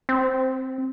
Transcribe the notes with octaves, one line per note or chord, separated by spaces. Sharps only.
C4